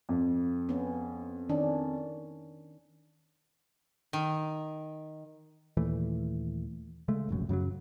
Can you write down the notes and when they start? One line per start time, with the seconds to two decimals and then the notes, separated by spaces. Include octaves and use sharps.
0.09 F2
0.69 B3 C#4
1.49 D#3 C#4 D4
4.13 D#3
5.77 D#2 A#2 E3 A3
7.08 C#3 G#3 A3
7.29 F1 A#1 F#2
7.49 F#2 C#3 F3 F#3